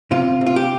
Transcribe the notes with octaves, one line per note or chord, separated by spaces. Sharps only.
C3 F4
C3
F4
G4